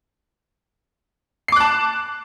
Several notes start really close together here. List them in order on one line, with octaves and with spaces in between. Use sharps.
C7 D6 F#6 A5